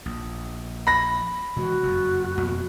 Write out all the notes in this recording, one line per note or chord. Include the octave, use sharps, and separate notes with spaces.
A#1
B5 A#6
C3 E3 G#3 F#4
F#1 F2
F2 B2 A#3